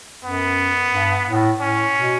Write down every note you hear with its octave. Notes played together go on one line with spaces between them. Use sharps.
F#2 B3
G2
A2
A2 C#4
B2